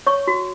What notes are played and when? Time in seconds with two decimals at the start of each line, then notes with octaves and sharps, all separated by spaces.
0.07 C#5 C#6
0.27 F#4